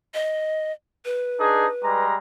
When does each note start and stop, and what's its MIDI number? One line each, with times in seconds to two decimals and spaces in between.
0.14 0.72 75
1.05 2.04 71
1.39 1.66 62
1.39 1.66 63
1.39 1.66 68
1.83 2.16 55
1.83 2.16 56
1.83 2.16 82